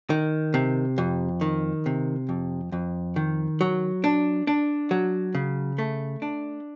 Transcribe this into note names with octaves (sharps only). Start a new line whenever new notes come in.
D#3
C3
F2
D#3
C3
F2
F2
D#3
F#3
D4
D4
F#3
C#3
A3
D4